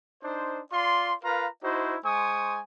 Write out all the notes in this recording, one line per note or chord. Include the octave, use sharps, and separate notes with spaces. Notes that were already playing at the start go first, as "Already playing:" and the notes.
D4 D#4 C5
F4 D5 C6
F4 A#4 B4 F5 A#5
D#4 E4 F#4 C5
G#3 C5 G#5 C#6 D#6